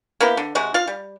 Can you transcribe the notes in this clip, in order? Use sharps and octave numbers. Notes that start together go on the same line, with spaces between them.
A#3 B3 E4 G4
D3
C3 G#3 F#4
F4 F5
G3